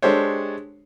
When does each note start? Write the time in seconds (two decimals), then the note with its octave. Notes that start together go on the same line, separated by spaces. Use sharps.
0.02 G#3 D4 G4 A4 C5 C#5